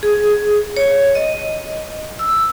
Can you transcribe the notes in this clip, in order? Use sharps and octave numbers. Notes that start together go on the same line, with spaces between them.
G#4
C#5
D#5
E6